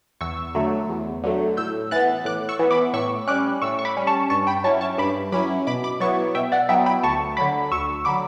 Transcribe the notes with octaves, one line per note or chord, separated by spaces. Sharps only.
E2 C#6 E6
D3 F#3 A3
E2
D3 F#3 A3
A2 E6 G6
E3 B3 F#6 A6
A2 D6 F#6
C#6 E6
E3 B3
B5 D6
A2 C#6 E6
G3 C#4 D6 F#6
A2 C#6 E6
C#6
B5 D6
G3 C#4
A5 C#6
G2 A5 C#6
G5 B5
F#3 C#4 E4 A5 C#6
A5 C#6
G2 B5 D6
F#3 C#4 E4 B5 D6
B2 B5 D6
B5 D6
F#3 B3 E4 A5 C#6
B2 E5 G5
D5 F#5
F#3 B3 E4 E5 G5
G5 B5
D2 A5 C#6
D3 F#3 B5 D6
D2 C#6 E6
D3 F#3 B5 D6